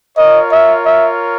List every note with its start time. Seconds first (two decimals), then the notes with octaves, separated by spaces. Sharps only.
0.17 F4 A#4 C#5 D#5
0.51 E5
0.85 E5